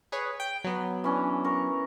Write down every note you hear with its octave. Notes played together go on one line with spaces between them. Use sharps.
G#4 B4 C#5
G5
F#3 B3
E3 C#4 D4
A#4 C#6